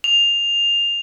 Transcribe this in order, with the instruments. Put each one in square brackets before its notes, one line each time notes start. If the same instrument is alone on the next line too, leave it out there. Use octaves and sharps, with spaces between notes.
[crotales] F7